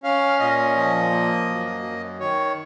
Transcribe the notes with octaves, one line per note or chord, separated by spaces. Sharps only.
C#4 F5
A#2 D#5
F3
A#3
F#2
F#2
D#3 C#5